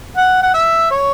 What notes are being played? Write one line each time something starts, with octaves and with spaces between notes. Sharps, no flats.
F#5
F#5
E5
C#5